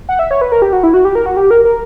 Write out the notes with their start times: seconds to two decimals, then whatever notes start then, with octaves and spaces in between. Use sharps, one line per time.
0.09 F#5
0.19 E5
0.31 C#5
0.41 B4
0.52 A#4
0.62 G4
0.73 F#4
0.83 E4
0.94 F#4
1.05 G4
1.15 A#4
1.26 F#4
1.37 G4
1.51 A#4
1.65 A#4